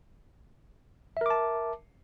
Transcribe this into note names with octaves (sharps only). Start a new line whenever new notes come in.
A#4 E5 A5 D6